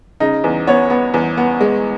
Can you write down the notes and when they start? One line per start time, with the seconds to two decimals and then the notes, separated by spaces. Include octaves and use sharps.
0.20 C#3 D#4
0.44 E2
0.67 B3 C#5
0.90 B3
1.14 E2
1.37 B3
1.61 G#3